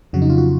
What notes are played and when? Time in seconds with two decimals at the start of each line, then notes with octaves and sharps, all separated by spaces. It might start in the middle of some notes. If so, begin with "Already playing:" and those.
0.13 F2 C#3 F#3 F#4
0.22 D#4
0.30 F4
0.38 F#4